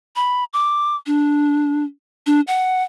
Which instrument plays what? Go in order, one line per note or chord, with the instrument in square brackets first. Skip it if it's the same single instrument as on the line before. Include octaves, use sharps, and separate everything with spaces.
[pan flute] B5
D6
D4
D4
F#5